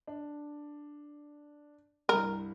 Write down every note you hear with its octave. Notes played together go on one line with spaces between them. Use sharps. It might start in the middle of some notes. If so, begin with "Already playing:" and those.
D4
C2 G2 A#4